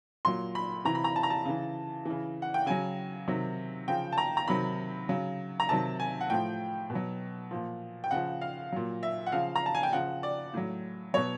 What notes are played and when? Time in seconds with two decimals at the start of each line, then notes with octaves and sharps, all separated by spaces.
0.25 A#2 F#3 C6
0.55 B5
0.85 C3 E3 A#5
0.95 B5
1.04 A#5
1.16 A5
1.23 A#5
1.30 A5
1.45 C#3 E3
2.05 C#3 E3
2.42 F#5
2.54 G5
2.66 C#3 F#3 G#5
3.28 C3 D#3 F#3
3.88 C#3 F3 G5
4.12 A5
4.18 A#5
4.37 A#5
4.48 C3 D#3 F#3 B5
5.09 C#3 F#3
5.60 A#5
5.69 C3 D#3 F#3 A5
6.00 G#5
6.21 F#5
6.30 A2 F3 G5
6.90 B2
6.95 F#3
7.51 A#2 F3
8.04 G5
8.11 C#3 F3 F#5
8.41 F5
8.72 A#2 F#3
9.03 E5
9.26 F#5
9.32 C#3 F3 F5
9.56 A#5
9.66 A5
9.75 G#5
9.83 G5
9.93 C#3 F3 F#5
10.23 D5
10.54 A2 F#3
11.14 B2 F#3 C#5